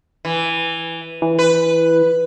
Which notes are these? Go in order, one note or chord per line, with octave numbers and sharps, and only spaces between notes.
E3
E3
B4